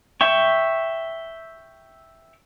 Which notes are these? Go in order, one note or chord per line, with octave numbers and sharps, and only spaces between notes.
E5 G5 C#6